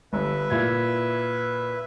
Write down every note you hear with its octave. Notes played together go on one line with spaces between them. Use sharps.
G1 B4 E5
A#2 E4 G#6